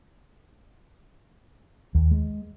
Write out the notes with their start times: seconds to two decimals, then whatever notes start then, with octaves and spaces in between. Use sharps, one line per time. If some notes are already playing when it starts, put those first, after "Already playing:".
1.95 D#2
2.11 G#3